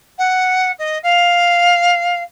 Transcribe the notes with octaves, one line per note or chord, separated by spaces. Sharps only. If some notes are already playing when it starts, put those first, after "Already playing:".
F#5
D#5
F5